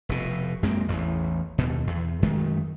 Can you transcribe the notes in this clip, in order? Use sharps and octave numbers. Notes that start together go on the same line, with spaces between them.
F1 B2
F#2 G#3 A#3 C4
A1 E2
D#2 B2
E2
F#2 D#3 G#3 A3